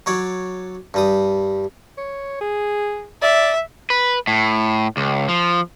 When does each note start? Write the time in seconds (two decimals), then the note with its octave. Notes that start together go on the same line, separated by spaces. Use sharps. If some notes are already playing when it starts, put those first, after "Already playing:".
0.06 F#3 C#5 D5
0.94 G2 G3 D#6
1.98 C#5
2.41 G#4
3.22 D5 E5
3.90 B4
4.27 A2
4.97 C#2
5.29 F3